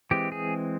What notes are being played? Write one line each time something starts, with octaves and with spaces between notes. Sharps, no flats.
E3 G#3 C4 G4
G#4